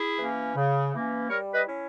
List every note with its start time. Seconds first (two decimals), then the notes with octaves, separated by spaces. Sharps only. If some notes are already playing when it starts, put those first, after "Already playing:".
Already playing: E4 G#4
0.19 E3 A#3 C#4
0.56 C#3
0.93 E3 A#3 C#4
1.29 G3 A#4 C#5
1.53 B4 D#5
1.67 C#4 E4